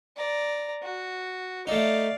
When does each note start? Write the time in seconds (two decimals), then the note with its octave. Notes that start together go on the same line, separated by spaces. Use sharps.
0.17 D5 A#5
0.83 F#4
1.67 A3 D#4 D5 F5